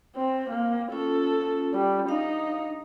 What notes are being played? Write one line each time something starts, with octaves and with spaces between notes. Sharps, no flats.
C4
A#3
C#4 F4 A4
G3
D4 D#4 F5